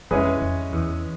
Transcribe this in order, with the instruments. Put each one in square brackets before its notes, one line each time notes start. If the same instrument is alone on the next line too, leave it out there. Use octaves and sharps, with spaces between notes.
[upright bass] F2 [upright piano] G#3 C#4 E4 G#4 B4
[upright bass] F2
E2